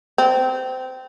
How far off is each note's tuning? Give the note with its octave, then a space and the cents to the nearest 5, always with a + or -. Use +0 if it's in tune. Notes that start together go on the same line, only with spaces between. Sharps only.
C4 -20